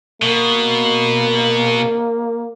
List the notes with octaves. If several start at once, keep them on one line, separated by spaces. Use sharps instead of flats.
B2 A#3